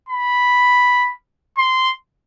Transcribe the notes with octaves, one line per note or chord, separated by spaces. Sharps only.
B5
C6